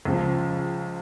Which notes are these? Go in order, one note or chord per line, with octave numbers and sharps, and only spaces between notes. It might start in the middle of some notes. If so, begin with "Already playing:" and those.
C#2 C#3 F3